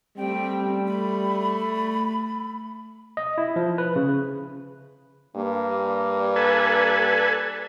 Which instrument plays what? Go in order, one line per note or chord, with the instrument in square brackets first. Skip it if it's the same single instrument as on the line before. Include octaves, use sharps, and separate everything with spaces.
[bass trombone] G3 [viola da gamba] A3 C4 [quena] G5
[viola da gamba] A3 [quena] B5
[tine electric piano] D#5
E4
F3
B4
C#3
[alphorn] G2 [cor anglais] A#3
[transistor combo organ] A4 B4 G#5